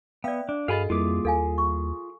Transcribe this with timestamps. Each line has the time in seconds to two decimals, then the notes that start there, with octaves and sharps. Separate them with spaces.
0.24 B3 D5 E5 F5 G5
0.49 D4
0.68 G2 F#4 G#4 A4 D#5 F5 G#5 B5
0.90 F2 G3 A#3 E4 F4 G#4 D6
1.25 D#2 A4 F5 G#5
1.58 C#6